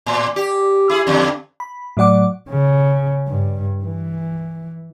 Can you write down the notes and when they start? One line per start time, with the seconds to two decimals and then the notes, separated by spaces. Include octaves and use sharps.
0.06 A2
0.36 G4
0.89 E4 G#4
1.07 E2 G2 D3
1.60 B5
1.97 A2 F#3 D5 F#5 D6
2.49 C#3
3.28 G2
3.85 E3